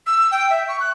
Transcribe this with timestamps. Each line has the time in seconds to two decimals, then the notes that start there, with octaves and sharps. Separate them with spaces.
0.06 E6
0.31 G5
0.50 E5
0.68 C#6
0.80 F#6